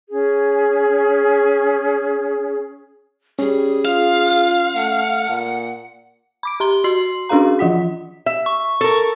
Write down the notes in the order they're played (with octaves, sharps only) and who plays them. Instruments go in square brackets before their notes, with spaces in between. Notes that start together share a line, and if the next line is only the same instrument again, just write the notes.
[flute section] C#4 G#4
[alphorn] G3 [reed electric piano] C#4 [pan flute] G#4
[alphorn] F4 [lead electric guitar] F5
[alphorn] A3 [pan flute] F#5
[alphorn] A#2
[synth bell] B5 D6 D7
G4 A#5 C6 G7
F#4 C6 C7 F#7
C#4 D4 F#4 G#4 F5 A#5
E3 F3 F4 F#5 B6
[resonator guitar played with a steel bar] E5
[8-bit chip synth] C#6
[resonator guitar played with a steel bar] A4 A#4